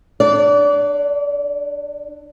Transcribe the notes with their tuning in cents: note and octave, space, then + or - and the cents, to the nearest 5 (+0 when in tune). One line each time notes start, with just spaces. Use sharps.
D4 +20 D5 -35